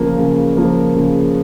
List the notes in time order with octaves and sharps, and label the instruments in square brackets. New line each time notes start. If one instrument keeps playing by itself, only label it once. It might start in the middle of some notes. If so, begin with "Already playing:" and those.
Already playing: [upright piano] C#3 F3 A#3
C#3
F3 A#3
C#3